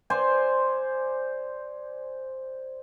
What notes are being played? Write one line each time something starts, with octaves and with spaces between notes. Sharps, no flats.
C5 D5 G#5